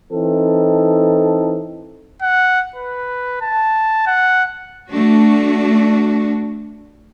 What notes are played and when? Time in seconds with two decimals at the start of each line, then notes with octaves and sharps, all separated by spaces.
0.12 E3 C4 D#4 A4
2.22 F#5
2.76 B4
3.42 A5
4.07 F#5
4.89 A3 D4 F#4